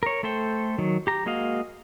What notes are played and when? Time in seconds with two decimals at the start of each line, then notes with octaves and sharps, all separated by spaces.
0.03 A#4 C#5
0.23 A3 A4 C5 G5
0.78 D#3 F#3
1.07 G4 A#5
1.26 G#3 A#3 F#4 D#5 F5